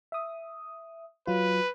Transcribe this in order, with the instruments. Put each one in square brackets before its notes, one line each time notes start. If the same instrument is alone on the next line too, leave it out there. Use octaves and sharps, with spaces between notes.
[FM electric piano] E5 D#6
[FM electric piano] F#3 F4 [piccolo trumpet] B4